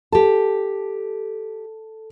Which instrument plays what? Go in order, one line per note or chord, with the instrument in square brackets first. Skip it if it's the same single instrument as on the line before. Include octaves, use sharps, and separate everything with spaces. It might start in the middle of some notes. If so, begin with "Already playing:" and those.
[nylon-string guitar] G4 A5 [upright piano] A4